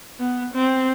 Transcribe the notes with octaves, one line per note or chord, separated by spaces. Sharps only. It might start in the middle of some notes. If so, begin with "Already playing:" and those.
B3
C4